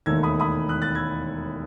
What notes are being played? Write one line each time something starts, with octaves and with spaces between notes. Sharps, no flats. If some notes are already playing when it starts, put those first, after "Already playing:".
E1 D#2 D#3 A3 E6 G#6
B5 D#6
B5 D#6
D#6 F#6
F#6 A6
E6 G#6